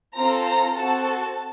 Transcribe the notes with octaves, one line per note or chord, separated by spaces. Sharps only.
C4 F4 A4 A#5
A#5
C4 F#4 A4 A5